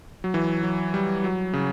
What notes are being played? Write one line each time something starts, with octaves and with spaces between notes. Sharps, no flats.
F#3
E3
F#3
G3
F#3
C#3